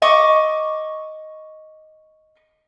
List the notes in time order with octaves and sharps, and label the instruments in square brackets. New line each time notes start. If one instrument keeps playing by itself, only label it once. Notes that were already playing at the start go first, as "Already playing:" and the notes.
[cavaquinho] D#5 C#6 D6